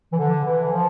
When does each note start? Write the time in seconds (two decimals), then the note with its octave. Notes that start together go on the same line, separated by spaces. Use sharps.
0.13 E3
0.18 D3
0.45 E3
0.72 F3